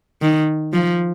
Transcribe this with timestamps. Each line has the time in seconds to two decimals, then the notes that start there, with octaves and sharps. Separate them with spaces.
0.22 D#3
0.73 F3